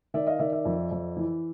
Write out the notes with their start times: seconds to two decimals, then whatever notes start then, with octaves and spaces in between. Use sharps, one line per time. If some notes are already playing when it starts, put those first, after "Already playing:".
0.14 D#3 D5 E5
0.27 D#5 F5
0.39 D#3 D5 E5
0.52 D5 E5
0.65 F2
0.91 F2
1.17 E3